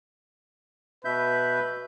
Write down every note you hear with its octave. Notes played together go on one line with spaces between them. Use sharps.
B2 B4 E5 G6